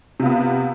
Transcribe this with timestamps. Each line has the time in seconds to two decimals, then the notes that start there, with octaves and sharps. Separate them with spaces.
0.20 C3
0.22 F4
0.25 B3